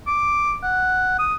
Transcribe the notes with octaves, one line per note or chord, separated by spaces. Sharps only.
D6
F#5
D#6